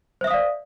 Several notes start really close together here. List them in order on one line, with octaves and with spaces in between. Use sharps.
C5 E5 D#6 F5 D5